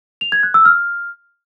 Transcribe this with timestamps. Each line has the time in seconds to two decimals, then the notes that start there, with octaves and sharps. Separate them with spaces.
0.21 F7
0.32 G#6
0.43 F#6
0.54 E6
0.65 F6